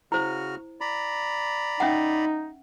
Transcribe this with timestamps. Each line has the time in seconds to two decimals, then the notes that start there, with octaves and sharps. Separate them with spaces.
0.12 C#3 E4 F#4 C5 F6
0.81 D5 A#5 B5
1.80 C#4 D#4 E5 F#5